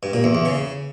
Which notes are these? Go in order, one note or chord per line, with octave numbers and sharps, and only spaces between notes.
G2
A#2
E2
E2
C#3